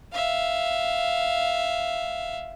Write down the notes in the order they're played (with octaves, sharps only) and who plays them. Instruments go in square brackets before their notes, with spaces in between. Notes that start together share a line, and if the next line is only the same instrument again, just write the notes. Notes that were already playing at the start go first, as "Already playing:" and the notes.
[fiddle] E5 F5